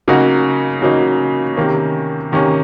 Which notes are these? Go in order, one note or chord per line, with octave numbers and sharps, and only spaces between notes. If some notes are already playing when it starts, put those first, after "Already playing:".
C#3 F#3 A#3 D#4 F#4
C#3 F#3 A#3 D#4 F#4
C3 D#3 A#3 C#4
C3 D#3 A#3 C#4